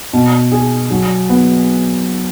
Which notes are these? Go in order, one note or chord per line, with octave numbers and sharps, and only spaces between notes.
B2
G#4
F#3
B3